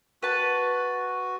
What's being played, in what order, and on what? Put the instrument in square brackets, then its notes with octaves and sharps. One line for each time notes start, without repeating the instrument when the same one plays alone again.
[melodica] F#4 [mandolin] B4 A5